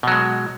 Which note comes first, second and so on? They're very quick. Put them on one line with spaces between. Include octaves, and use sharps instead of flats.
B2 F#3 G#3